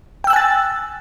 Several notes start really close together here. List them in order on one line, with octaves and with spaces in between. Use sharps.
G5 E6 F#6 G#5 A6